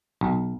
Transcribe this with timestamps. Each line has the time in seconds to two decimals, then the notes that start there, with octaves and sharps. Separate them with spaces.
0.21 B1